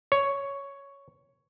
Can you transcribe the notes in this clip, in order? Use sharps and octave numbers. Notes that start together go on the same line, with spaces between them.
C#5